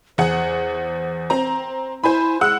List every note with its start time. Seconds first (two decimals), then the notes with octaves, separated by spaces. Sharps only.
0.18 E2 G#4 C5 F#5
1.30 C4 A#5
2.04 E4 C5 G#5 B5
2.41 G#3 F#5 E6 F#6